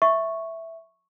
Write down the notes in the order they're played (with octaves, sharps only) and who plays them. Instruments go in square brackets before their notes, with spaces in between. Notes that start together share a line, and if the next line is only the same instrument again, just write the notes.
[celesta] E5 [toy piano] C#6